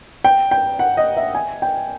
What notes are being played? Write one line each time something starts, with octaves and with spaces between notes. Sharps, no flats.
G5
G5
F#5
D#5
E5
G#5
G5